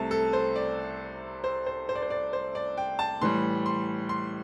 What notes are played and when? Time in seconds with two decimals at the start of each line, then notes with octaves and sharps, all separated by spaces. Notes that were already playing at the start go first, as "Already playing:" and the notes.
Already playing: C2 C3 A3 A5
0.11 A4
0.33 C5
0.56 D5
1.44 C5
1.66 C5
1.89 C5
1.95 D5
2.02 C5
2.10 D5
2.33 C5
2.55 D5
2.77 G5
2.99 A5
3.21 A2 E3 G3 C6
3.66 C6
4.09 C6